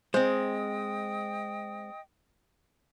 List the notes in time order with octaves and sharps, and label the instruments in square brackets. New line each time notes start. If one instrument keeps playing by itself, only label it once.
[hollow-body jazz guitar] G#3 C4 [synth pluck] C5 [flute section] D#5 G5 D#6